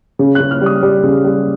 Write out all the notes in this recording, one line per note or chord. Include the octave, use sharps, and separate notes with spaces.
C#3
C#3 F#6
F6
G3 D#6
G3
C#3
G3